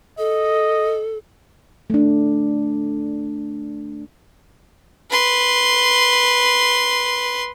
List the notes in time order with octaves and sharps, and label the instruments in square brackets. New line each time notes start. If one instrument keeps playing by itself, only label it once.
[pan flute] A4 [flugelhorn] D#5
[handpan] A3 D4
[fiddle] B4 C6